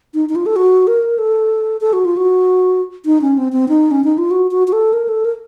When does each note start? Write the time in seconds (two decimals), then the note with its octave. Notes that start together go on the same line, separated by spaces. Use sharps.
0.14 D#4
0.29 D#4
0.35 F4
0.46 A4
0.56 F#4
0.87 A#4
1.18 A4
1.81 A4
1.93 F#4
2.05 F4
2.17 F#4
3.06 D#4
3.22 C#4
3.38 C4
3.52 C4
3.68 D#4
3.91 C#4
4.04 D#4
4.18 F4
4.31 F#4
4.51 F#4
4.68 F#4
4.73 A4
4.93 A#4
5.09 A4
5.25 A#4